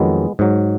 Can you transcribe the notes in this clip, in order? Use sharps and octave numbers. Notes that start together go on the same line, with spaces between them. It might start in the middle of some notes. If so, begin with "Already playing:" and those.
Already playing: F2 D#3 F#3 G#3 B3
G#2 F#3